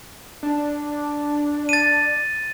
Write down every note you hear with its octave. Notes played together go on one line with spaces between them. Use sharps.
D4
A6 D#7